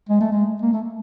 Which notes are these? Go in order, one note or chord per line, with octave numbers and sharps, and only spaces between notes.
G#3
A3
G#3
A#3
A3